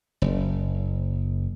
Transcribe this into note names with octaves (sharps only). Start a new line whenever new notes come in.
F#1